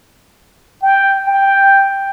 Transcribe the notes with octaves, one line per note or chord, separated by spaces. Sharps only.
G5
G5